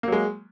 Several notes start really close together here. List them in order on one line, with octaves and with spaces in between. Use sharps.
A#3 F#3 G#3